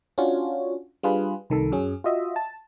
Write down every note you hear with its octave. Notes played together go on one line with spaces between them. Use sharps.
C#4 D4 F4 F#4 C#5
G3 D4 F4 G#4 B4
C2 D#3 A4
F#2 F#3 C#4 G#4
F4 F#4 D#5 E5
A5